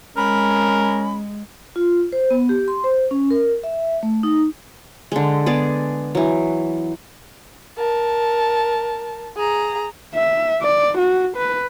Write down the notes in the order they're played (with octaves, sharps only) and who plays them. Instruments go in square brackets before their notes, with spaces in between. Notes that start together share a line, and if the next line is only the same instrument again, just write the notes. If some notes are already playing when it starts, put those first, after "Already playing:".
[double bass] G#3 [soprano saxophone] C#4 [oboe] A#4 [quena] B5
[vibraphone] F4
C5
B3
G4
C6
C5
C#4
A#4
E5
A3
D#4
[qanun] D3 G#3
B3 G#4 D5
E3 F#3
[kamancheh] A#4 A5
G#4 A#5
[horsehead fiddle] E5
D5
F#4
B4